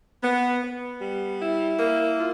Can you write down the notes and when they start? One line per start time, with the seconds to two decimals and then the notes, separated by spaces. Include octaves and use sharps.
0.22 B3
0.61 B3
0.99 G3
1.39 E4
1.77 A#3
2.16 F4